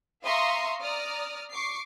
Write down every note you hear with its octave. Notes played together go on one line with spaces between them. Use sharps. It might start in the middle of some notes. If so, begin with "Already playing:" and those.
E5 F5 A#5 C6 C#6 D#6
D5 A#5 D#6 F6
C#6 D6 C7